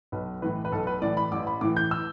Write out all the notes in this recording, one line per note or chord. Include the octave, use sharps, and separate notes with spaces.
B1 B4
A2 E3 B4
B4
B1 A4
B4
A2 E3 D5
B5
A1 D6
B5
A2 E3 D6
G6
E6